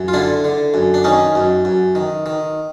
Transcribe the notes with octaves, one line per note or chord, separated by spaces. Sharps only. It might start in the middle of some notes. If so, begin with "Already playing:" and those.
Already playing: F#2
F4
D3 D4 E4
D3
F#2
D4
D#3 C#4 D#4
F#2
F#2
D#3
D#3